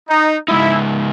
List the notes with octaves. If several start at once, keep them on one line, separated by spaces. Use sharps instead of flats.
D#4
C#3 G#3 D#4 E4